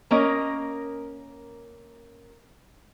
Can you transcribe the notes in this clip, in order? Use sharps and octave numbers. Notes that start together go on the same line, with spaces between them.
A#3 C#4 A#4 D#5